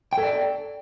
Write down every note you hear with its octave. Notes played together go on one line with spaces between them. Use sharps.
A4 D5 G5